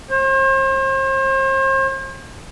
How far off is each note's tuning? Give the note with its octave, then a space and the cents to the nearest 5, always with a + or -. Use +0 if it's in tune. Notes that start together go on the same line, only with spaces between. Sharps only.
C5 +40